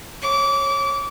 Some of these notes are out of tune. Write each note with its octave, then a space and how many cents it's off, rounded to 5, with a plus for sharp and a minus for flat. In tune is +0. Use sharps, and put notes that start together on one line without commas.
C#5 -20 D6 -25